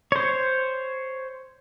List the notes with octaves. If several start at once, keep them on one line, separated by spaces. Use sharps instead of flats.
C5 C#5